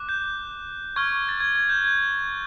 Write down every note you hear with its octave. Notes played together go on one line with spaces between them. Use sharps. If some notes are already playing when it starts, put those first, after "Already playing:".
Already playing: D6 F#6
G6
C#6 F6 G#6
A6
G#6
G#6
G6
G#6